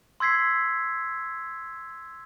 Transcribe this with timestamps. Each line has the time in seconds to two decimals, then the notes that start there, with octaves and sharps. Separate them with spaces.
0.20 C6 E6 G#6 B6 C7